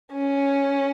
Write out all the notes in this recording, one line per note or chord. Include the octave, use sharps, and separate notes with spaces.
C#4